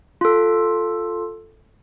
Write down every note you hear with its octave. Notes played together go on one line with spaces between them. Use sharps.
F4 A4